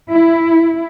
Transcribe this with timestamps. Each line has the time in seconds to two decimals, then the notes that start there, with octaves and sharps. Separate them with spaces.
0.10 E4